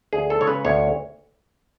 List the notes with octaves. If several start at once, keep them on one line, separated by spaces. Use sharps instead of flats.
D2 G#4
A4
C#3 G#3 C#5
B4
D2 C#5